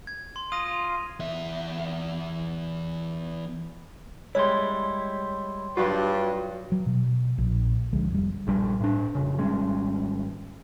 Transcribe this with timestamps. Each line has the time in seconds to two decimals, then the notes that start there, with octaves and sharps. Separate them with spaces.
0.07 G#6
0.36 C6
0.52 F4 D#6 A#6 D#7
1.20 E2 E5
4.35 G3 G#3 E4 C#5 C6
5.77 G2 F#3 F4 F#4
6.72 F#3
6.86 B2
7.38 A#1 A#2
7.93 C#2 D3 F3 G#3
8.10 F1 G3
8.47 A#1 G2 G3
8.81 A2 D4
9.15 F1 C#3
9.39 G#1 G3 G#3 C#4